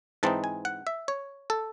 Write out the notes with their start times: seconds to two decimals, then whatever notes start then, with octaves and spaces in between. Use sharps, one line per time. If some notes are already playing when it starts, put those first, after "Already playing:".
0.23 G#2 E3 C4 D#4 A5
0.44 G#5
0.65 F#5
0.87 E5
1.08 C#5
1.50 A4